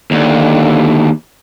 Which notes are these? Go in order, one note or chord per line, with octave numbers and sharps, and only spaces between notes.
D#2 D3